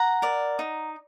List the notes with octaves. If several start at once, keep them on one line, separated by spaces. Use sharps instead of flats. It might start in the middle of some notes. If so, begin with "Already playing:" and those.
Already playing: F#5 A#5
A#4 D5
D#4